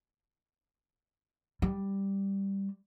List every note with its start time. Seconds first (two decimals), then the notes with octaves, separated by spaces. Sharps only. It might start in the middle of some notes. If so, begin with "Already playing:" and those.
1.62 G3